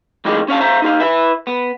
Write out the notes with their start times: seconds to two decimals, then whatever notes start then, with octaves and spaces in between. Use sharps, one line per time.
0.25 F2 A2 D#3 G#3 G4
0.48 C#4 C#5 F5 A5
0.61 C5 E5 F5 A#5
0.82 D#4 G4 F5
1.00 E4 B4 E5
1.47 B3